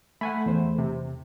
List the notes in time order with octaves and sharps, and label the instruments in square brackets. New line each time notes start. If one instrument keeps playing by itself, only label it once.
[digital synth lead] A3 [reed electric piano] F#5 G#5 B5
[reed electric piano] E2 C5
[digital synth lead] C3